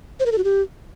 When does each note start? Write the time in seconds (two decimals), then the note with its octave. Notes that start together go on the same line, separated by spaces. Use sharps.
0.20 C5
0.26 A#4
0.32 A4
0.38 F#4
0.44 G4